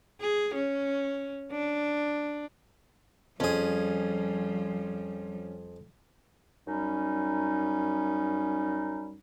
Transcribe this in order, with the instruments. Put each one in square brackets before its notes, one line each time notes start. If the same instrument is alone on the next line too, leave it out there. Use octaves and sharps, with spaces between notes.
[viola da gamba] G#4
C#4
D4
[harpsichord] F2 G#4 [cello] F3 G3 [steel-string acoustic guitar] C#4
[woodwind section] F#2 G3 C#4 D#4